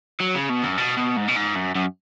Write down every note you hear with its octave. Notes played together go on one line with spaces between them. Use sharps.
F#3
C#3
B2
F#2
B2
B2
G#2
B2
G#2
F#2
F#2